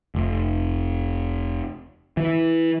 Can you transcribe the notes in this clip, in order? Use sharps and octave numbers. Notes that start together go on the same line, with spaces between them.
F1
E3